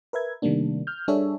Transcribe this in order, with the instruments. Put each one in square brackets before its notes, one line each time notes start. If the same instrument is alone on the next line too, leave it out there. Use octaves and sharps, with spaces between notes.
[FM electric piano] A#4 B4 E5 G#6
C3 D#3 G3 A3 A#3 D4
F6 G6
G3 D4 G#4 A4 C#5 E5